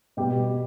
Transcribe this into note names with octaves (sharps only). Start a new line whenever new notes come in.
B2 G3 B3 G4